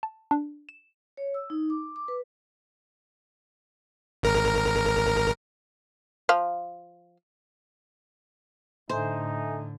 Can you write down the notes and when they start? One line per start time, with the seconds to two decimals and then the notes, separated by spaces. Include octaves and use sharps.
0.03 A5
0.31 D4
0.69 E7
1.17 C#5
1.34 E6
1.50 D#4
1.70 D6
1.96 D6
2.08 B4
4.23 G#1 A#4
6.29 F3 F5
8.89 A2 D3 D#4 A4 C5 E5 G#5